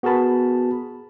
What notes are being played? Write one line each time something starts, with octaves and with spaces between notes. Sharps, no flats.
B3 F#4 G#4 A#4 A5 B5